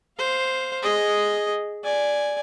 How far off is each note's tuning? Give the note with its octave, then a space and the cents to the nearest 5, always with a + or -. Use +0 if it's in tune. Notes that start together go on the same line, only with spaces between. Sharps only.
C5 +0 F5 +10
G#4 +0 D#5 +0
D5 +0 G#5 +0